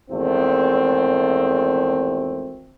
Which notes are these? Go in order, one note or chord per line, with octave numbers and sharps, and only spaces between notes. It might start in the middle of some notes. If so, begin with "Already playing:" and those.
G#1 E2 A3 C4